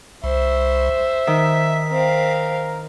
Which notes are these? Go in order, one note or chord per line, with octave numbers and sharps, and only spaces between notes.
C2 C5 E5
D#3 B6
C4 A#4 F5